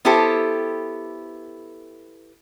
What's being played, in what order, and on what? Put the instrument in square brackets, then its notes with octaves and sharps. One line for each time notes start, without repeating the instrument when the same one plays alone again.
[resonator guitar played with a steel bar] B3 E4 G4 A4 C5